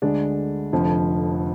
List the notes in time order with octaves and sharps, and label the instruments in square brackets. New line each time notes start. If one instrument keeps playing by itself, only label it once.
[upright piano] D2 D3 G#3 D4
F1 F2 D3 F3